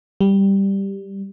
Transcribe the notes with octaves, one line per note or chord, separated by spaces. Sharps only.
G3